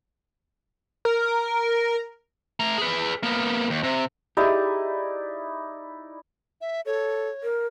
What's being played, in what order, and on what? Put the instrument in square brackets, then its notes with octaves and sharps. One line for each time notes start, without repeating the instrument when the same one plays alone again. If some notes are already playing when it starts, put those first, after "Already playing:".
[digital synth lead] A#4
[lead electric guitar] A3 A#5
G#4 B4
A#3 B3
D#2
C3
[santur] D#4 E4 D5 [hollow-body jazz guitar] G4 G#4
[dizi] E5
[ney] A4 [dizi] C#5
[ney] A#4